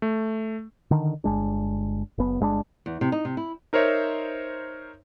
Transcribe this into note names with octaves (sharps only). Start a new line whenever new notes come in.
A3
D3 D#3
G1 G#3 D4
F#1 B3
G1 G#3 C#4 D4
E2
C3
D#4
C3
E4
D#4 A#4 C5 C#5 E5